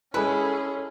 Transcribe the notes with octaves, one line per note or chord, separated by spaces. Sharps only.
G#3 C#4 E4 G#4 A4 B4 G#5 B5